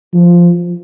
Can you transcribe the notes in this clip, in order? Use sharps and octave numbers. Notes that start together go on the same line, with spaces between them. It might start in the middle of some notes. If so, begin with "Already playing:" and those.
F3